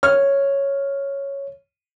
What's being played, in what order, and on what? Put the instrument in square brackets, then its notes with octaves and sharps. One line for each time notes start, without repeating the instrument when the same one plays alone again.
[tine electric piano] C#5 [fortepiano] F6